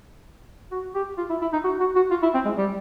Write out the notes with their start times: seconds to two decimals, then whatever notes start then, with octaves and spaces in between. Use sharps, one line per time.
0.71 F#4
0.95 G4
1.18 F4
1.30 E4
1.42 E4
1.53 D#4
1.64 F#4
1.80 F#4
1.95 F#4
2.11 F4
2.22 E4
2.34 C4
2.45 G#3
2.57 G3